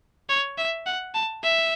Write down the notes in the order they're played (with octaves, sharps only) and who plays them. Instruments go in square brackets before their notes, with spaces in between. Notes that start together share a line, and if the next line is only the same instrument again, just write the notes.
[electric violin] C#5
E5
F#5
A5
E5